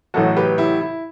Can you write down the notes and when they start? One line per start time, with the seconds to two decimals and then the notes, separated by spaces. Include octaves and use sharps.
0.14 A1 A2 F#3 F#4 A4
0.37 G4 B4
0.58 E4 G4
0.81 E4